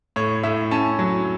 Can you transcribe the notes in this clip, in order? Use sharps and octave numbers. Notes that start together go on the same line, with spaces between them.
A2 C#5
A2 E5
C#4 A5
F#3